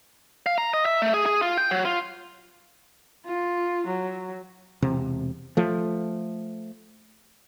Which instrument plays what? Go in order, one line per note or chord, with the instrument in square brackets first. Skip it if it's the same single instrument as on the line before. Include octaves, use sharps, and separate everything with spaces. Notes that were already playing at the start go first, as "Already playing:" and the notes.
[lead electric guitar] F5
A#5
D#5
E5
A3
G#4
G#4
F4
G5
F#3
F4
[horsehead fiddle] F4
F#3
[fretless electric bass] E1 C3
F3 A3